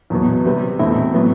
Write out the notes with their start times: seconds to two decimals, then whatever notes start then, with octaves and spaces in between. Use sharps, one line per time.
0.10 E2 B2 F#3 B3
0.45 C3 G3 C4 G4 B4
0.79 E2 B2 A3 C4 E4
1.14 A2 F#3 B3